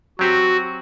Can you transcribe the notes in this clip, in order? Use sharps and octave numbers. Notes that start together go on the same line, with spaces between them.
F#3 C4 F#4 G4